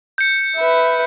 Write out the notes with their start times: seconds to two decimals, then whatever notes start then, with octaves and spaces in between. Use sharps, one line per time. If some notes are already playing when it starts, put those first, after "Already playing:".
0.18 G6 C#7
0.56 B4 E5